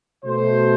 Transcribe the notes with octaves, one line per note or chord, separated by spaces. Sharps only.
B2 A3 C5